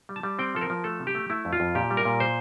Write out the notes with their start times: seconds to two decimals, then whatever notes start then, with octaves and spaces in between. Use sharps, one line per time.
0.09 G3
0.16 A5
0.23 G3
0.39 C4 G5
0.55 F3 A4
0.61 A#4
0.70 F3
0.84 A3 A4
1.00 C3
1.07 G4
1.15 A3
1.30 A3 E4
1.45 F2
1.53 F4
1.60 F2
1.75 A#2 G4
1.91 G3
1.97 A#4
2.05 A#2
2.20 C5